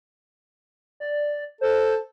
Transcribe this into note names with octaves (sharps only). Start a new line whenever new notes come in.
D5
A4 C5